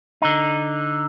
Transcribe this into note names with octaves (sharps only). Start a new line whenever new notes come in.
D3 D#4